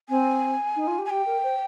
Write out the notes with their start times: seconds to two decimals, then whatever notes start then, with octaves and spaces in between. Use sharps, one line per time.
0.09 C4 G#5
0.76 D#4
0.87 F4
0.99 G4
1.05 G#5
1.10 G4 G5
1.26 A#4
1.43 C5